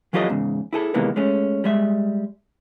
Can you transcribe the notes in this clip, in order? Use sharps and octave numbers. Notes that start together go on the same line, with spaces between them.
E3 F#3 F4 G4 A4 D#5
E2 G#2 C#3
E4 G#4 A4
C3 D#3 E3 G#3 A#3 B3
G#3 A3 C#4
G3 G#3 E5